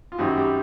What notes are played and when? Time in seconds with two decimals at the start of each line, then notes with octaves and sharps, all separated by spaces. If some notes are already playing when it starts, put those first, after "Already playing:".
0.12 F4
0.18 F#2 D#3 G3 C4 F#4
0.37 G3 G4